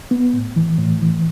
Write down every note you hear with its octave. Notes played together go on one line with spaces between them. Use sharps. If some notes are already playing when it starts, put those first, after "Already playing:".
B3
A2
E3
A2
E3